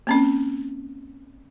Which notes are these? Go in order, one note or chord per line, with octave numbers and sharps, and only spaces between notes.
A#3 C4 C#4